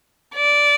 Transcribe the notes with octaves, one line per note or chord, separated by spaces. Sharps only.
D5